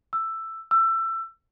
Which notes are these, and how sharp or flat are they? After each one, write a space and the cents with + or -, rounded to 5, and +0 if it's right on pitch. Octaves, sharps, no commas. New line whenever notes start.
E6 +10
E6 +25